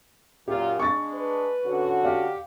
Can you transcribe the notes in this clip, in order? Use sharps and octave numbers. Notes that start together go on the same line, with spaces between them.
F#2 A#2 F4 G4
G#3 D4 C#6 A6
B4
D3 C#4 F#4
G4 D5 F5